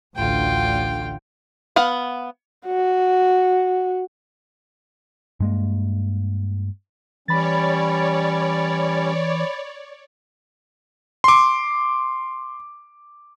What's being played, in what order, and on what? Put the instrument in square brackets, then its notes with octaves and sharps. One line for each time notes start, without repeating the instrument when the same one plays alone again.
[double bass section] A1 D2 D3 [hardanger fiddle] F4 G5
[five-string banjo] B3 F5 F#5
[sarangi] F#4
[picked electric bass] G2 G#3 A#3
[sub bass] E3 [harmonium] G3 C#4 [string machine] C#5 D5 [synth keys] B5 A6
[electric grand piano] C6 D6